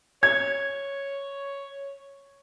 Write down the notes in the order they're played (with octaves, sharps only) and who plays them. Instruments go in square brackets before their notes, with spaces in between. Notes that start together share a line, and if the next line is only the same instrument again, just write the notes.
[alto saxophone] C#5 [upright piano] G#6